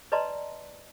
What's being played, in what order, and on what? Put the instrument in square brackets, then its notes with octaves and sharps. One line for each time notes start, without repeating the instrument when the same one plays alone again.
[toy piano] B4 D5 D#5 A5 A#5 C6